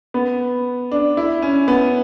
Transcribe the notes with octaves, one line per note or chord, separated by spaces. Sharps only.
B3
D4
E4
C#4
B3